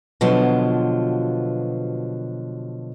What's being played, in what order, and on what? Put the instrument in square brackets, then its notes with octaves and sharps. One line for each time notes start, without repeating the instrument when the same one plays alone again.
[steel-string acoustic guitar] B2 D3 F3 F#3 F4